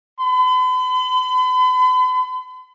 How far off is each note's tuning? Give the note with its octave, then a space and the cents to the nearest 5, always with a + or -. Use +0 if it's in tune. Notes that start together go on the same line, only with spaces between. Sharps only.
B5 +45